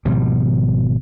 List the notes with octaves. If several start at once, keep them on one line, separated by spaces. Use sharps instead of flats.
G#1 B2 F3 G3